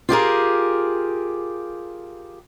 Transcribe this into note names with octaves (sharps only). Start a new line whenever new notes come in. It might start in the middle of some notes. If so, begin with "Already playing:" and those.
F4 G4 G#4 A#4